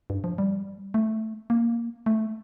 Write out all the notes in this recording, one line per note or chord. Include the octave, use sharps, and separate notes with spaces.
G2
F3
G3
A3
A#3
A3